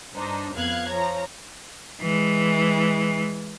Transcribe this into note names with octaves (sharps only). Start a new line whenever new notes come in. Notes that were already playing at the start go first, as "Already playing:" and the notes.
G2 D4 D#4 C5 A#5
F2 B3 F5 F#6 G#6
F3 C#5 A#5
E3 G#3